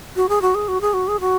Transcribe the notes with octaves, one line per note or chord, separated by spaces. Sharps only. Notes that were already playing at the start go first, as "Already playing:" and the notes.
F#4
G#4
F#4
G#4
F#4
G#4
F#4
G#4
F#4